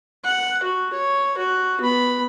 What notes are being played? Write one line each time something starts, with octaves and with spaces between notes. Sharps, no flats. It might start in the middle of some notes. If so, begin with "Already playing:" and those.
F#5
F#4
C#5
F#4
B3 B5